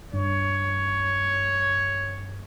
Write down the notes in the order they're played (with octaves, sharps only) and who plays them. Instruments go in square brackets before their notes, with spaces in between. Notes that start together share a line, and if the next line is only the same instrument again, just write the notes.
[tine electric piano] G2 [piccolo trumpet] C#5